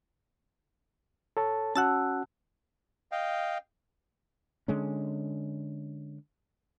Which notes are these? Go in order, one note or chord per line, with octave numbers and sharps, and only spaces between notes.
A4 C#5 A5
C#4 F#4 F#5 A5 E6 F#6
D#5 F5 G5
D3 G#3 C#4